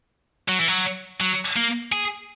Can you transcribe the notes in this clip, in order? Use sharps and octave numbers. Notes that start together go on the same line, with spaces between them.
F#3
E3
F#3
F#3
A#3
G#4